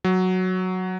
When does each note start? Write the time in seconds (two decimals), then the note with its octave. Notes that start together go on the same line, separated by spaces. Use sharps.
0.04 F#3